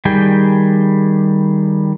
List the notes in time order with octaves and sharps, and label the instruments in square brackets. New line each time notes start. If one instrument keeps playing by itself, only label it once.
[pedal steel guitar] D#3 G3 G#4 G5